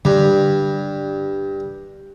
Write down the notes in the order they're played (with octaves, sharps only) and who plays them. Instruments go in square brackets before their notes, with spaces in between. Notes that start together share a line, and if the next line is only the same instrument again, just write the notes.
[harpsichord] G2 [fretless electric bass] D3